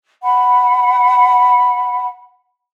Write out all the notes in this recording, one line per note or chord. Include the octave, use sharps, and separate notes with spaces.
F#5 B5